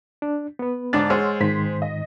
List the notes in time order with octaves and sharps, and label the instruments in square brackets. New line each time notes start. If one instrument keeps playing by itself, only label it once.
[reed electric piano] D4
B3 B4
[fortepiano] G#2 D4 [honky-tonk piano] D3 C#5 A6
[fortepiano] G#3 [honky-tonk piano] C5 F#5 [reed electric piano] C#5 E6 F6
[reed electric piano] G#2 D#3 [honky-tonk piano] C5 B6
[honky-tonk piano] D#5